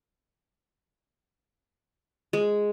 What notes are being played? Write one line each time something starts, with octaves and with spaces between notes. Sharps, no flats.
G#3